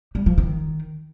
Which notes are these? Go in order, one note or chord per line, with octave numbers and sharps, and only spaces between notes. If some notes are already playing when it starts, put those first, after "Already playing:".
G3
F3
D#3